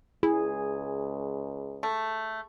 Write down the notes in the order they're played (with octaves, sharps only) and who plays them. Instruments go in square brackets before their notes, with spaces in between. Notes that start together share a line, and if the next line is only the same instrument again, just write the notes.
[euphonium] C#2 [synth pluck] E4 [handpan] G#4
[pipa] A3